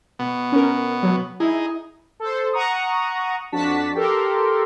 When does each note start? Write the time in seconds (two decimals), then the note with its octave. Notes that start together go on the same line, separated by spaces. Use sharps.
0.19 B2 B3
0.52 C#4 A#4
1.03 F#3
1.40 D#4 E4 G#4
2.20 A4 C5
2.53 F#5 A#5 C#6 D#6
3.52 F2 D4 F#4 A5 B6
3.94 G4 A4 A#4 C6